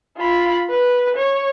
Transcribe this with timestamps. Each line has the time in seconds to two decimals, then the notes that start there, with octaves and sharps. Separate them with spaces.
0.17 F4 B5
0.70 B4
1.17 C#5